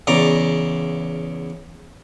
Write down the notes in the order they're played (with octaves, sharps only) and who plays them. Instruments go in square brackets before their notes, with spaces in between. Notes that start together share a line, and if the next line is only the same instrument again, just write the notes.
[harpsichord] E2 C#3 D5 A#5